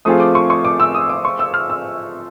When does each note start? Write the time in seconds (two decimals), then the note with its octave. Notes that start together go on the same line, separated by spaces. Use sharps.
0.05 F3 A3 C4 F4 G#4 D#6
0.20 D6
0.35 C#6
0.50 C#6
0.65 D6
0.80 E6
0.94 D#6
1.09 D6
1.25 C#6
1.39 E6
1.54 F6
1.70 E6